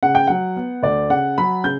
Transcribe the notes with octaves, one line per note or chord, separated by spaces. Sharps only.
C#3 F#5
G5
F#3 F#5
B3
D2 D5
C#3 F#5
F#3 B5
C#3 G6